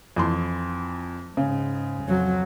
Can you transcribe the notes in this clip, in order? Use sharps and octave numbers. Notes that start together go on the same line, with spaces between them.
F2 E3 C6
G#2 C#3
F2 F#3